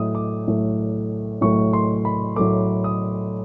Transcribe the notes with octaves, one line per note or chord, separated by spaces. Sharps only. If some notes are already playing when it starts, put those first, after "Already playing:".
Already playing: A2 F#3 A3 D#6
D6
A2 F#3 A3
A2 F#3 A3 C#6
C6
B5
A2 F#3 A3 D6
D#6